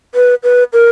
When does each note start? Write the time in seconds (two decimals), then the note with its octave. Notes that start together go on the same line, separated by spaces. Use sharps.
0.15 B4
0.44 B4
0.73 A#4